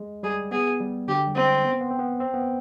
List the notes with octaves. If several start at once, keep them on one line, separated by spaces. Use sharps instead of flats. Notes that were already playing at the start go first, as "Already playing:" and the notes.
Already playing: G#3
G3 G#4
B3 G#4
G3
D3 G4
G3
G#3 C4
B3
C4
B3
C4
B3
C4
B3